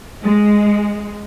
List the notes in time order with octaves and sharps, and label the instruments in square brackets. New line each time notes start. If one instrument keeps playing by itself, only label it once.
[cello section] G#3